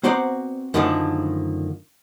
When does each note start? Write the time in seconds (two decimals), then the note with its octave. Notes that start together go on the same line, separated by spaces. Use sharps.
0.03 B3 C4 F#4 C5 D5 A#5
0.74 F#2 D3 D#3 F3 A3 D4